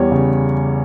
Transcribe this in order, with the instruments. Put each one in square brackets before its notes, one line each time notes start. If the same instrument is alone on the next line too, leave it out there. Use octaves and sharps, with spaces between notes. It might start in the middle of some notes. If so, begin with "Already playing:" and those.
Already playing: [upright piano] E2 G3 C#5
C#3